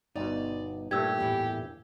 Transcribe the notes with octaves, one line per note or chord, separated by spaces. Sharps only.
G1 B2 D#4 D5
G2 A#2 A3 G4 E6 G#6
E2 A2 E3